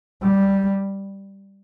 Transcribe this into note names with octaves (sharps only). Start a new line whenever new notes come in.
G3